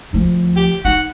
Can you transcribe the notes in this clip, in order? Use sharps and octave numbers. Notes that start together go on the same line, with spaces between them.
D2 F3
G4
D#4 F#5